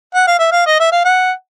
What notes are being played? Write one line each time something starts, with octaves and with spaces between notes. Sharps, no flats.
F#5
F5
E5
F5
D#5
E5
F5
F#5